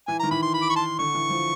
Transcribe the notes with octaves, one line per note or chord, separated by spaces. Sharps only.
E3 G#5
D#3 A#5
E3 B5
C6
B5
D6
C#6
A5 C6
D3 C#6
E3
F3